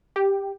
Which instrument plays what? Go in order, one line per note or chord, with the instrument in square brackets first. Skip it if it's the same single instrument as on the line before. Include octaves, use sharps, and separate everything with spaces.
[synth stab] G4